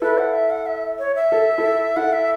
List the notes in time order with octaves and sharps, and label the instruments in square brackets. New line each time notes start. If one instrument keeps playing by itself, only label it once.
[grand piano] E4 A4 [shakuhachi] B4
[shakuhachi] F#5
E5
F#5
E5
C#5
E5
[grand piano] A4
E4 A4
[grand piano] E4 A4 [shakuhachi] F#5
[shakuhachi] E5